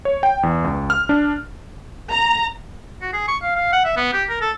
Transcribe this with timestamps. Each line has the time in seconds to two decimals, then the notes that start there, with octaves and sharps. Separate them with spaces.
0.05 C#5
0.23 G5
0.43 E2
0.64 C#2
0.90 F6
1.09 D4
2.12 A#5
3.02 F#4
3.13 G#4
3.28 C#6
3.43 F5
3.56 F5
3.73 F#5
3.85 E5
3.97 B3
4.13 G4
4.29 A#4
4.41 A4